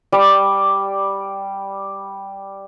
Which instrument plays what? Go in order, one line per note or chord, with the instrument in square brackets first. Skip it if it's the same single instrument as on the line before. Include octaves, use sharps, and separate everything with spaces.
[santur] G3 D5